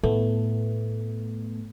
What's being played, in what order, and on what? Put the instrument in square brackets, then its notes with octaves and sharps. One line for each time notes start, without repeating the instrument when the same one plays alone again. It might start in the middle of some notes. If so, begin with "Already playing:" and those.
[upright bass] A2 [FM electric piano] A3 B3